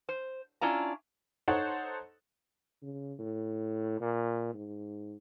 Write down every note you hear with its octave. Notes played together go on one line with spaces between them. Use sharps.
C5
C#4 D4 E4 F4 A#5
D#4 A4 C5 C#5 F#5
C#3
A2
A#2
G#2